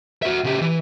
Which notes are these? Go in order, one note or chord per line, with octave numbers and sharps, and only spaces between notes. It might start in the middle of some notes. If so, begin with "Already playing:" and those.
F#4 E5
C#3 G4
E3